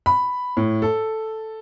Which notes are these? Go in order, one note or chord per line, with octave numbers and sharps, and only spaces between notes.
B5
A2
A4